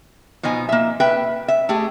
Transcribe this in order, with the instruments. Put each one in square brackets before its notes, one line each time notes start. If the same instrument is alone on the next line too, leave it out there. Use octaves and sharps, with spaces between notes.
[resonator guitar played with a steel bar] B2 F3 D#4 G#5
A#3 E5
B4 E5 G5
E5
A3 G4 G#4